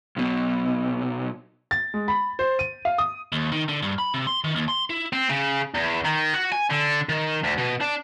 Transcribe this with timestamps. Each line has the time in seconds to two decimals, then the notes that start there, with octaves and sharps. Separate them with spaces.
0.17 B1 B2
1.71 A6
1.94 G#3
2.08 B5
2.39 C5
2.59 D#7
2.85 F5
2.98 D#6
3.32 D#2
3.52 D#3
3.69 D3
3.83 G2
3.98 B5
4.14 C3
4.27 C6
4.44 D#3
4.56 D#2
4.68 C6
4.90 E4
5.13 C4
5.30 C#3
5.75 E2
6.05 D#3
6.34 F#4
6.52 G#5
6.70 D3
7.09 D#3
7.44 D2
7.58 B2
7.80 D4